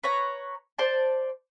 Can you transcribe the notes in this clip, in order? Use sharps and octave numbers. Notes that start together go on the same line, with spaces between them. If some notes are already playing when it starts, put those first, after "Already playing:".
B4 C#5 A#5
C5 D5 A5